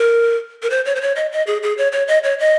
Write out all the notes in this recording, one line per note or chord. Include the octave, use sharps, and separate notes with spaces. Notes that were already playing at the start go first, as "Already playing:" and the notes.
Already playing: A#4
A#4
C5
C#5
C5
C#5
D#5
D#5
G#4
G#4
C#5
C#5
D#5
C#5
D#5